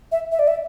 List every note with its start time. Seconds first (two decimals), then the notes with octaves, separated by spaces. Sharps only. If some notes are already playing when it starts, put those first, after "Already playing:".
0.12 E5
0.32 E5
0.39 D5
0.48 E5